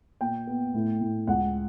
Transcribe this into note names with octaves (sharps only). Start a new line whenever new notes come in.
A#2 G5
B3
A2
A2
C#2 F#5